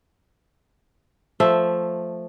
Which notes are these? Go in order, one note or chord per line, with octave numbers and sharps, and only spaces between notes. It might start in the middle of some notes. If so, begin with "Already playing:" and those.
F3 A3 E5